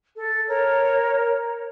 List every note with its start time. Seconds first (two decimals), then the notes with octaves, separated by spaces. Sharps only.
0.16 A4
0.46 A#4 C#5